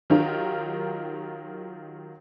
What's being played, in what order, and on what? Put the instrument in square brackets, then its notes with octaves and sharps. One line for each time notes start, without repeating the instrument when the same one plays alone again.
[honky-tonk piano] D#3 F#3 D#4 F4 G4 A#4